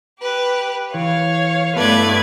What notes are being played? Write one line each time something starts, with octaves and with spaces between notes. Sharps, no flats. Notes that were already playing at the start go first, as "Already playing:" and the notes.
G4 B4
E3 C#5 F5
G2 A3 B3 E4 A4 B4 D5 G#6